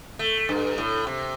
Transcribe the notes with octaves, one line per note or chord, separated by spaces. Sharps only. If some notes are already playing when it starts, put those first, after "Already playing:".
A3
G2
A2
C3